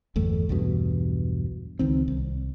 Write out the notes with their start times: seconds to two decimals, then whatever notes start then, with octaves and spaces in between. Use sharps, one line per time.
0.16 G1 E2 A3
0.49 B1 E2 G2 B2
1.79 C#2 D#3 C4
2.08 C2